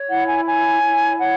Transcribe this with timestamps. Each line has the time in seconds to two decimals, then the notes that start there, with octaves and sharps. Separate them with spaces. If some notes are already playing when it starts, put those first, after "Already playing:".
Already playing: C#5
0.09 E4 F#5
0.27 G#5
0.46 C#5 G#5
0.82 E4
1.19 C#5 F#5